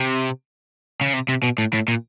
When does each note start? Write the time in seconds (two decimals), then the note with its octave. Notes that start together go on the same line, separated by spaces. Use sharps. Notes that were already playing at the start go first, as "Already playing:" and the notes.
Already playing: C3
1.01 C#3
1.13 C3
1.29 C3
1.43 B2
1.58 A2
1.73 A2
1.88 A#2